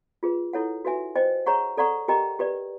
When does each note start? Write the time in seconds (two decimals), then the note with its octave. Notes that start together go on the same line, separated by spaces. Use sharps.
0.23 F4 G#4 B4
0.53 E4 A4 C#5 F#5
0.85 F#4 B4 E5 G#5
1.15 C5 D#5 G5
1.46 G#4 C#5 F#5 A#5 C#6
1.77 A4 D5 F#5 A#5 C#6
2.08 G4 A#4 D#5 G5 A#5
2.39 G4 B4 D5